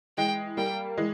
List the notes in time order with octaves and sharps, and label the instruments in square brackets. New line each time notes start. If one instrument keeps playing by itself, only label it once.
[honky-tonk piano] E3 G#3 [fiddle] G5
[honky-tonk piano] G3 A#3 [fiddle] G5
[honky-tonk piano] E3 G#3